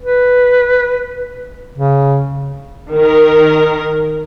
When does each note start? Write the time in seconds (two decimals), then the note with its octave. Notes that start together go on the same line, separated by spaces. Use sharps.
0.01 B4
1.78 C#3
2.93 D#3 A#4